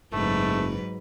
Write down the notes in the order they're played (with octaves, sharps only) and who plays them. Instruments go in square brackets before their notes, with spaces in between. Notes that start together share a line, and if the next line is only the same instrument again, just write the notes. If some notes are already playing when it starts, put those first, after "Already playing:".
[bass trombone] F#1 [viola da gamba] G#2 F#3 B4 [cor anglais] A3